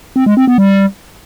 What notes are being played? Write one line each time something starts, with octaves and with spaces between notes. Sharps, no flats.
C4
G#3
C4
B3
G3